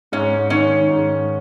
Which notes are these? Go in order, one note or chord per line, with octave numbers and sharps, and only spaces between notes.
G#2 C#4
D#3 C#4
G#2